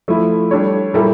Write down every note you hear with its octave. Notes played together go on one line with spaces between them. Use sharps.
F3 A3 E4
G3 D4 A4 C#5
A#2 G3 A#3 E4 A4